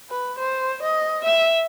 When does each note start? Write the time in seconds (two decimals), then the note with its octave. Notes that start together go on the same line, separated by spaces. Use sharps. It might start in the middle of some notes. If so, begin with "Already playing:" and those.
0.11 B4
0.39 C5
0.82 D#5
1.25 E5